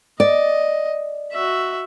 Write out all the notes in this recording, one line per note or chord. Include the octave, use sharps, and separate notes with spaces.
D5 D#5
F#4 E5